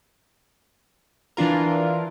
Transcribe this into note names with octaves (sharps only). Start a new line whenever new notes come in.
E3 D4 F4 A#4